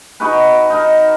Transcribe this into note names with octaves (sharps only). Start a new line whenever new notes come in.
D#4 F#4 G#4 B4
D#4 A#4